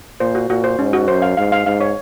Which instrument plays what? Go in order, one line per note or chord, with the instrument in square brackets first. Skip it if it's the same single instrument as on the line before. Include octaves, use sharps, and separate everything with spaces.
[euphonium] A#2 [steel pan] C5
[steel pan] F#4
[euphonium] A#2 [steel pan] F#4
[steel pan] C5
[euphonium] G#2 [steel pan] C#4
[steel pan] F#4
[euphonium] F#2 [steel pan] C5
[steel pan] F5
[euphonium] G#2 [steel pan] F5
[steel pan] F5
[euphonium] G#2 [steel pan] F5
[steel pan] C#5